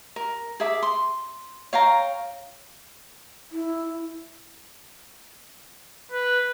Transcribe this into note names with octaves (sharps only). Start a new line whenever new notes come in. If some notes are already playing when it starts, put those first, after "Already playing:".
A#4
G#4 E5 D6
C6
C#5 F5 G5 A#5
E4
B4